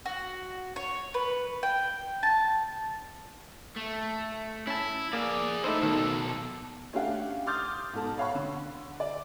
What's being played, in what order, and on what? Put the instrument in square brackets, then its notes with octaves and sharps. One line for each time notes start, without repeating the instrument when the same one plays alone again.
[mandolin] F#4
C#5
B4
G5
A5
[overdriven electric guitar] A3
[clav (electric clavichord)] C#4 A5 [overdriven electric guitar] E4
[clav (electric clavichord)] A#3 [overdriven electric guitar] G#4 D5
[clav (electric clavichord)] A3 D#4 C5 [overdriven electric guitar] E4 A4
[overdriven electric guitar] B2 A4 [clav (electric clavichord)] D#3
[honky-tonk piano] A3 C#4 D4 G4 F5 F#5
C6 D6 D#6 F6 G6 A6
G#2 B2 A4 A5
C#5 F5 F#5 B5 C#6
D3
D5